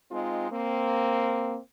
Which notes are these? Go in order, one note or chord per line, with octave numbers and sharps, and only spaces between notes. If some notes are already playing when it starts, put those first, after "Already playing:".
G#3 C4 D#4 F4
A#3 C4